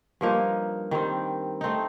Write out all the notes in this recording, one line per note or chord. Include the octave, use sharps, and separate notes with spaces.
G2 F3 A#3 D#4
D#3 G3 C4
A3 C4 D#4